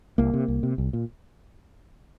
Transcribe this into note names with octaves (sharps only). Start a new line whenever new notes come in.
C2 A#3
C3
C2
C3
C2
A#2